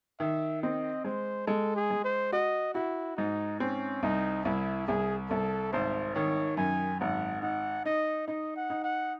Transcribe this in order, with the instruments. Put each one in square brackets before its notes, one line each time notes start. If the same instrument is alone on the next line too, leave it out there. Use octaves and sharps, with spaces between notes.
[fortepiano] D#3 [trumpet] E5
[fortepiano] C4 [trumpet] D#5
[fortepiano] G#3 [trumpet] C5
[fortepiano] G#3 [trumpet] A4
[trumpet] G#4
[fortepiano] G#3
[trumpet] C5
[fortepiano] F#4 [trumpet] D#5
[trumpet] E4 [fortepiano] F#4
[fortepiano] G#2 [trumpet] D#4
[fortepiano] C4 [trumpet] C#4
[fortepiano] C2 [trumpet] D#4
[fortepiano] C2 [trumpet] E4
[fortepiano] C2 [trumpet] G#4
[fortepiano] C2 [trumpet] A4
[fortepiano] G#1 [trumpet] C5
[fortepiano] D#3 [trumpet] C#5
[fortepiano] F#2 [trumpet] G#5
[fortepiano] G#1 [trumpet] F#5
[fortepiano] D#4 [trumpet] F#5
[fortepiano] D#4 [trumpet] D#5
[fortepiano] D#4 [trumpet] D#5
[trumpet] F#5
[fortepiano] D#4
[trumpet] F#5